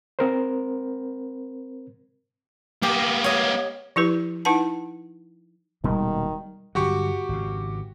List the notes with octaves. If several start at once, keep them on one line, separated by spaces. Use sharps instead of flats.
C4 A#4 C5
A#3 B3 G4
C#5 D#5
F3 E4 G4 B4
D#4 E4 B4 F#5 A5
D#1 B2 D#3 G3 G#3
G2 D3 F#3 F#4 G4 C#6
G#1 C#3